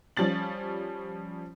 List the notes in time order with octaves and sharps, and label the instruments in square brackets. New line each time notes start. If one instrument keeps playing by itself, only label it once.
[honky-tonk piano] F3 G3 C#4 A6 F#7